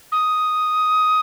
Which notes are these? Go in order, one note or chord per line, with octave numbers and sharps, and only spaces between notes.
D#6